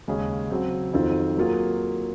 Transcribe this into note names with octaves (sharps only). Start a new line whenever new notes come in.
D#2 C#3 G#3 C#4 G#4
C#3 F#3 C4
F2 D#3 F#3 C4 F4
F#3 A#3 F4 G#4